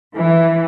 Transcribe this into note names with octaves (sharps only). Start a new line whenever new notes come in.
E3